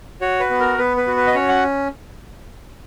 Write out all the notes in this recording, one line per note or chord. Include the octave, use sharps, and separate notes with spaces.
F#4 C#5
B4
B3
A#4
B3 B4
B4
F#4
B4
D#5
C#4 C#5
F#5